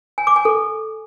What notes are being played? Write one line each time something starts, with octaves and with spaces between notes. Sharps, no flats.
G#5
D6
G#5
A4